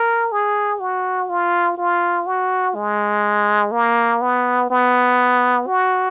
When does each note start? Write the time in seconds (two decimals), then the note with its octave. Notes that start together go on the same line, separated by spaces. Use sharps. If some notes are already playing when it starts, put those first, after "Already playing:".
Already playing: A#4
0.32 G#4
0.81 F#4
1.29 F4
1.78 F4
2.27 F#4
2.75 G#3
3.72 A#3
4.21 B3
4.70 B3
5.67 F#4